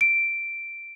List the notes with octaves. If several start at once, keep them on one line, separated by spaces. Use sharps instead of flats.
D7